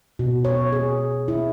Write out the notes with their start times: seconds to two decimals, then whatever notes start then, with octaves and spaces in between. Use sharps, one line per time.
0.19 B2
0.45 C#5
0.72 G#4
1.28 E4